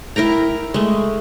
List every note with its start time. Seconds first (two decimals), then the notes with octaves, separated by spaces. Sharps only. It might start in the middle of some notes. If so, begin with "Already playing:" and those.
0.16 E4 A#4 G5 A#5
0.74 G#3 A3